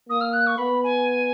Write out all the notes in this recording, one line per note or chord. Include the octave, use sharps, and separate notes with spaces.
A#3 D#6
F6
F#6
C#6
B3 B5
G#5